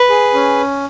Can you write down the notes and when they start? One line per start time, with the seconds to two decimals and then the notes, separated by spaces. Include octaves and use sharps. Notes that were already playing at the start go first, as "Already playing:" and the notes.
Already playing: B4
0.10 G#4
0.34 C#4